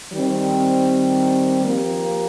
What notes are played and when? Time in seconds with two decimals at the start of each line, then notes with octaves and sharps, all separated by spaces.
0.13 D#3 G3 C4
1.62 F3 A#3 G4 A#4